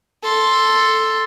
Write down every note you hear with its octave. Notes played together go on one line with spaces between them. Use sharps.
A4 C6